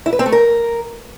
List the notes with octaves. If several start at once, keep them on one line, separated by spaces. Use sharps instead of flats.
E4
B4
C4
A3
A#4